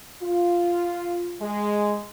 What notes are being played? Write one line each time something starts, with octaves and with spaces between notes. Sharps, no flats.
F4
G#3